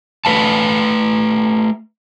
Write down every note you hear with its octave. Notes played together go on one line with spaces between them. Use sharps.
A3 B4 F5 A5